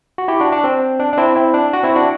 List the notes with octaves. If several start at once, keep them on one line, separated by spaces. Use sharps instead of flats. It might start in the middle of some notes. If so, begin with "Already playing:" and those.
F#4
E4 G4
D4 F#4
D4
C4
D4
D4
C4 E4
C4 E4
D4
F#4
C4 E4
D4 F#4